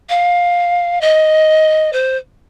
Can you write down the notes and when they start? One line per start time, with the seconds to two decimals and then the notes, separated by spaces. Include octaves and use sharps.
0.09 F5
1.01 D#5
1.93 C5